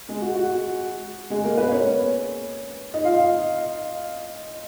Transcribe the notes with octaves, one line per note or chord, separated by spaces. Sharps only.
G#3 G#4
F#4
F#4
G#3 G#4
A#3 A#4
B3 B4
C#4 C#5
D#4 D#5
F4 F5